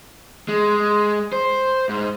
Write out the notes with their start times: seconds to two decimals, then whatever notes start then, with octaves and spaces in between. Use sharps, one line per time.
0.49 G#3
1.33 C5
1.89 G#2